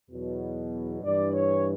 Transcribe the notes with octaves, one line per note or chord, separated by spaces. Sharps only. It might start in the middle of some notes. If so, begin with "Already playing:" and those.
E2 B2 F#3
G2 E3 D5
C#5